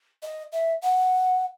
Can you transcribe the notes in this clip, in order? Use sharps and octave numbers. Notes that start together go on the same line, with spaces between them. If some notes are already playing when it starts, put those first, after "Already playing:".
D#5
E5
F#5